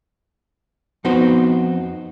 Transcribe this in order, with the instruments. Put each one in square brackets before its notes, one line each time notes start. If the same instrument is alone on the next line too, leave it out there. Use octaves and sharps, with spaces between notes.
[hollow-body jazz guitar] F2 B3 D#4 F#4 C5